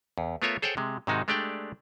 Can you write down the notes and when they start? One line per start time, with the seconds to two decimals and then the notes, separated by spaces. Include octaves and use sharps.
0.18 E2
0.42 A3 B3 F4 A#4 C#5 E5
0.62 G#4 A4 C5 C#5 F#5 G5
0.77 C3 G#3
1.07 G#2 C3 D#3 G#3 D#4 F#4
1.28 G#3 A3 D4 G4 D5 G5